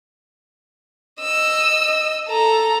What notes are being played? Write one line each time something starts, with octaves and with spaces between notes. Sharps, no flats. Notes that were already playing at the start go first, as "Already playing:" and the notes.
D#5 E6
A4 A#5